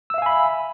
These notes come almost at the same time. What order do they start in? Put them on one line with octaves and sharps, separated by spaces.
E6 E5 F5 G#5 B5